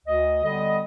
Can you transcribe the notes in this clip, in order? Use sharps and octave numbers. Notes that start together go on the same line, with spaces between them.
D2 D#5
D3 G3 B3 D#5